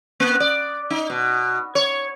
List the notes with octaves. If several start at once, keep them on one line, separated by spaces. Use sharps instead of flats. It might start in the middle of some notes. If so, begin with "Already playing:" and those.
A#3
D5
D#4
B2
C#5